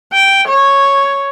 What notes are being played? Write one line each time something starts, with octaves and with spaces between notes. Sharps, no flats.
G5
C#5